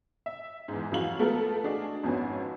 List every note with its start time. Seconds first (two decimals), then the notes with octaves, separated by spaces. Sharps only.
0.26 E5
0.68 E2 G#2
0.92 F2 E3 F#3 F#4 F5 F#7
1.19 A3 B3 F4 A4 A#4
1.64 D4 F#4 G#4 D#5
2.03 G#1 F2 B3 C#4 F#4 G#5